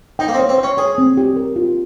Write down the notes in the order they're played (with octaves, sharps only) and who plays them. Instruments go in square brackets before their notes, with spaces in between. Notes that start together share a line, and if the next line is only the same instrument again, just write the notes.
[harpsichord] D#4 [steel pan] G5
[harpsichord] A#3
C4
[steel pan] C#5
[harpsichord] C4
[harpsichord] C#4 [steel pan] G5
[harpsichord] G#4 [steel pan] C#5
[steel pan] C4
G4
A#4
F4